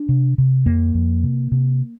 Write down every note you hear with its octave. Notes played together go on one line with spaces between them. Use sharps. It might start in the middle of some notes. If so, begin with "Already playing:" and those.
Already playing: D4
C3
C3
F2 A#3
F2
C3
C3